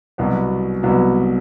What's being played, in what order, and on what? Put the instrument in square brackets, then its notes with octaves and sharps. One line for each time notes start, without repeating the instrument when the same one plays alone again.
[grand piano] C2 B2 F#3 B3
C2 B2 F#3 B3